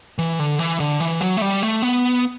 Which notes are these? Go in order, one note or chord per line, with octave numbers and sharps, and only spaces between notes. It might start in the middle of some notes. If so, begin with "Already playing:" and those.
E3
D3
E3
D3
E3
F#3
A3
G3
A3
B3